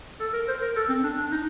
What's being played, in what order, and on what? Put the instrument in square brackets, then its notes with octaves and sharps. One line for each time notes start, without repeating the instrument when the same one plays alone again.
[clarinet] A4
A#4
C5
A#4
A4
C4
D4
D4
D#4